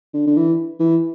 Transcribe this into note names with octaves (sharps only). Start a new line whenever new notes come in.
D3
D3
E3
E3